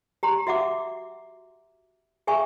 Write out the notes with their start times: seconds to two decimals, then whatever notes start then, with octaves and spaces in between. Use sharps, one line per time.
0.23 G4 A#5 C6
0.47 F#4 E5 F#5 D6
2.27 G#4 E5 G#5 C#6